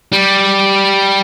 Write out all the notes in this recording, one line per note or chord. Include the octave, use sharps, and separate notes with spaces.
G3